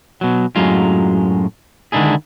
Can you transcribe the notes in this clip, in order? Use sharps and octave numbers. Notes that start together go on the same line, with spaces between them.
B2 F#3
F#2 A2 F#3 G#3 F4
D3 D#3 G#3 D4 E4 G#4